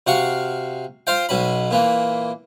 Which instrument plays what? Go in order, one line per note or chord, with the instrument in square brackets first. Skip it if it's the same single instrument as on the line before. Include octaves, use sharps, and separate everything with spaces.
[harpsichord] C3 F#4 F5 C#6
F4 C5 F5 G5
B1 B2 C#4 B5
A#2 E3 A#3